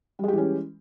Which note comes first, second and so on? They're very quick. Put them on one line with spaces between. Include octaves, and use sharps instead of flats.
G3 G#3 G4 E3 C#4